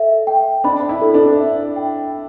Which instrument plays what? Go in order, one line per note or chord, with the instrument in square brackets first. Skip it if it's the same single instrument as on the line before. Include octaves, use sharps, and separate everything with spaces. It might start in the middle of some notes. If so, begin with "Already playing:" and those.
Already playing: [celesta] A4 E5
G5
[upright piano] D4 [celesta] B5
[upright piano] E4
[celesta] A4
[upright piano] D4
[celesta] E5
G5